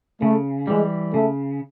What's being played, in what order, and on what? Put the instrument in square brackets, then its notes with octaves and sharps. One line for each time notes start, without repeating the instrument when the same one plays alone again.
[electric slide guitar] C#3 [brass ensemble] A3
[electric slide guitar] E3 G3 [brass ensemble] G#3
[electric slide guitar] C#3 [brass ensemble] A3